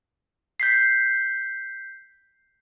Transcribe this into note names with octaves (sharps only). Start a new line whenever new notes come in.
G6 B6 C7